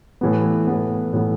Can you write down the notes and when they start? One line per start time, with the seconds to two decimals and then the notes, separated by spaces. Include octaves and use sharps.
0.21 A2 E3 B3
0.67 A2 E3 B3
1.13 A2 E3 B3